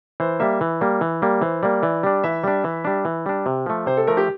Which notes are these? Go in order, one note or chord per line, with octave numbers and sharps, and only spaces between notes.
E3 C5
G3 A#3 E5
E3
G3 A#3
E3
G3 A#3
E3 C5
G3 A#3 D5
E3 D5
G3 D4
E3 E5
G3 D4
E3
G3 D4
E3
G3 D4
C3
F3 A3
C3 C5
A4
F3 A3 A#4
G4